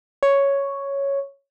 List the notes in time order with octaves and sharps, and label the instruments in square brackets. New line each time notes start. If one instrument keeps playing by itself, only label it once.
[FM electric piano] C#5